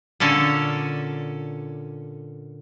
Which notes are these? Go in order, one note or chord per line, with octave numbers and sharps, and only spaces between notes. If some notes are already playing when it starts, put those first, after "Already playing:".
A#2 D3 C#4 A4